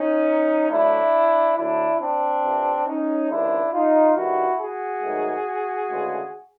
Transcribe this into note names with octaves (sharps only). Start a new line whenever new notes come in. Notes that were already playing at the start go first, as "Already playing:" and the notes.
Already playing: C#4 D#4
D2 D3 F#3 A3 D4 E4
D2 D3 F#3 A3 D4 E4
C4 D4
F2 C3 E3
C#4 D#4
C#2 C3 D#3 G#3 D4 E4
D#4 F4
G2 D#3 G3 E4 F#4
F#4 G#4
G#2 D#3 F#3 A3
D2 C#3 E3 G#3